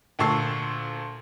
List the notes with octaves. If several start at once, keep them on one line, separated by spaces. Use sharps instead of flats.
D2 A#2 A5 C#6 E6 C7